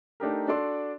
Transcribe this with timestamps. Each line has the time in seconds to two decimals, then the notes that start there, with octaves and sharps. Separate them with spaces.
0.20 A3 D4 D#4 G4 A#4
0.48 D4 F#4 A4 D5 C6 D6